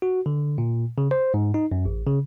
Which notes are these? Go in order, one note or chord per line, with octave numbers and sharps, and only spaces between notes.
F#4
D3
A#2
C#3
C5
G#2
D#4
F#2
A1
C#3